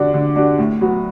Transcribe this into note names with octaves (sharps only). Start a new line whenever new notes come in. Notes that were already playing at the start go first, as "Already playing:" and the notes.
Already playing: D3 G3 D4 F#4
D3
G3 D4 F#4
A2
F#3 B3 F#4